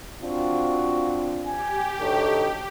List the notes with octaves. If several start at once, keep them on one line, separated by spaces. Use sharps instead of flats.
C4 D4 F4 F#4
G4 G#5
D2 D#4 A4 C#5